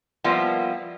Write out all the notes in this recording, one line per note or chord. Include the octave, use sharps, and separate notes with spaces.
F3 G3 A#3 B3 E4 F4